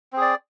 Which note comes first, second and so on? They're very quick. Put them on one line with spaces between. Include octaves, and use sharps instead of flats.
C4 G#4 D5